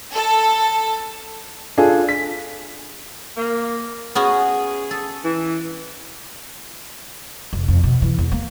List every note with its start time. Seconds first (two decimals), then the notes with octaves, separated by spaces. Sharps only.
0.13 A4
1.78 D4 F4 G#4 A4
2.09 B6
3.37 A#3
4.15 B3 C#4 F#4 G#4
4.91 A4
5.24 E3
7.53 F1
7.68 F2
7.83 B2
8.02 E3
8.18 E2
8.32 A#3